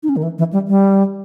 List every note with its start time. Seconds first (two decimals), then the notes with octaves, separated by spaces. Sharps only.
0.03 D#4
0.09 C#4
0.17 D#3
0.23 E3
0.38 E3
0.53 G3
0.68 G3